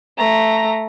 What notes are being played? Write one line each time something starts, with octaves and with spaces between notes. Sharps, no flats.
A3 A#5